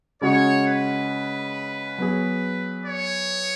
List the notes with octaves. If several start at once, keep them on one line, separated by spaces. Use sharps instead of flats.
C#3 G#3 C#4 F#4 C#5
B4
F#3 B3 G#4
C#5